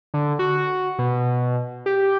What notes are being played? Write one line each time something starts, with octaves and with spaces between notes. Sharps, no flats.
D3
F#4
B2
G4